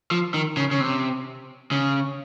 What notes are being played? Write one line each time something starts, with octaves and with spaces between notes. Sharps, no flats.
F3
D#3
C#3
C#3
C3
C#3